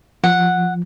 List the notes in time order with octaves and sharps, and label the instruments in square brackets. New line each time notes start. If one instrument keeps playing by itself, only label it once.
[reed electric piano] F3 [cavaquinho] F#5